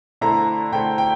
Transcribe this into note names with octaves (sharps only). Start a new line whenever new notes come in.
D3 A3 E4 A4 C5 A#5
D3 A3 E4 A4 C5 G5
G5